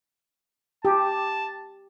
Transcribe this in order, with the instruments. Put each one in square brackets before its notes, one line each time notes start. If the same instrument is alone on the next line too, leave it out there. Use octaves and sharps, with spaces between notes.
[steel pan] G4 [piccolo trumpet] A5